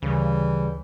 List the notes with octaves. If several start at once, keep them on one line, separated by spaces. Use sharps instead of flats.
D2 C#3 E3 G3